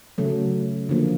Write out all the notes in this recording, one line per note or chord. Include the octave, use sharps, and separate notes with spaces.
C#3 F#3 A3
D3 F3 A#3